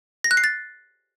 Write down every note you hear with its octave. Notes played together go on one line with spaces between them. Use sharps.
A#6
F#6
C7
A6